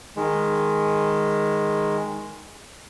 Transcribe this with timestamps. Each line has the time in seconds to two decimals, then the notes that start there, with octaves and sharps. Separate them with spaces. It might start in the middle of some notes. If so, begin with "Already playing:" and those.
0.16 D#3 G#3